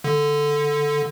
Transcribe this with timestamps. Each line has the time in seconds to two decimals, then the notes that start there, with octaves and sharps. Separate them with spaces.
0.04 D3